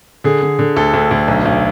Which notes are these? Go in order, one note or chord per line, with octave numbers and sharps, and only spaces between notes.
D3 G#4
D3
D3
D2 A4
D2
D2
B1
B1